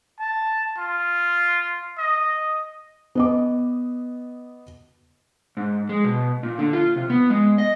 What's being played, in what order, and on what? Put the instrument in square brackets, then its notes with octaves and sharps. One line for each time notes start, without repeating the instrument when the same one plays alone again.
[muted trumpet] A5
F4
D#5
[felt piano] B3 D#5 D6
[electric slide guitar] G#2
G#3
B2
A#2
D3
F4
C3
B3
G#3
D#5